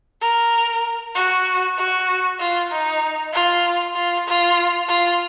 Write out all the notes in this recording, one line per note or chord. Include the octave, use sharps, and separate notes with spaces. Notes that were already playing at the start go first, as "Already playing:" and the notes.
A#4
F#4
F#4
F4
D#4
F4
F4
F4
F4